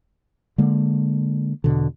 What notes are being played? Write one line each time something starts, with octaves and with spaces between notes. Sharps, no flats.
D3 G#3 A#3
E2 B2 D3